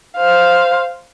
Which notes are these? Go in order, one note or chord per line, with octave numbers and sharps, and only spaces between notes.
C5 F5